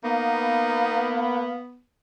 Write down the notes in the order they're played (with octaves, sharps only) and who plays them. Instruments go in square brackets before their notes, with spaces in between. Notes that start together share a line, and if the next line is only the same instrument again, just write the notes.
[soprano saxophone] A#3 [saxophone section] B3 [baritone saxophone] D#4 [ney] F5